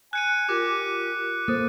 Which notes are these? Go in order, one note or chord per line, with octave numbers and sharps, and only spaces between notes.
G#5 F#6 C#7 D#7
F4 G4 A#4 D6
A#3 A4 C5 D#6